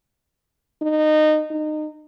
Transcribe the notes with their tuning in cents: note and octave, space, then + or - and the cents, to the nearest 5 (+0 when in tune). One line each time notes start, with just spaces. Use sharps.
D#4 -20
D#4 -25